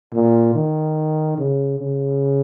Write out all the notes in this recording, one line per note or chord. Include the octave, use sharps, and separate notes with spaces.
A#2
D#3
C#3
C#3